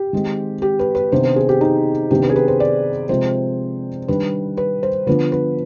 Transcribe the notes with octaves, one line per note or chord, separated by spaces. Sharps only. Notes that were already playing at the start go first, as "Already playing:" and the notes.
Already playing: G4
D#3 G#3 C4
G4
B4
B4
C3 D#3 B3 D4 C5
C5
G#4
G4
D#4
C3 D#3 B3 D4 G4
B4
G#4
B4
C5
D5
C3 F3 G#3 C4 C5
D#3 G3 D4 B4
B4
C5
D3 F3 B3 D4 B4
B4